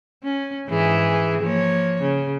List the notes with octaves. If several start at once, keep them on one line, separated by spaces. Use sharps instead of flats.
C#4
G#2 E3 G#4
F3 A#3 C#5
C#3